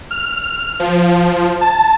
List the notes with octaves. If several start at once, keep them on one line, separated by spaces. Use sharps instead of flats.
F6
F3
A5